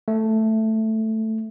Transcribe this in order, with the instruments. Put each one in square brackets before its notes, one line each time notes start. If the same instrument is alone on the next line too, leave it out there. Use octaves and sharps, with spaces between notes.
[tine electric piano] A3